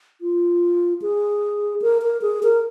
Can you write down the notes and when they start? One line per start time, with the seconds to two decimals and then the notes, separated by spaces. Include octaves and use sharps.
0.21 F4
1.02 G#4
1.82 A#4
2.02 A#4
2.22 G#4
2.43 A#4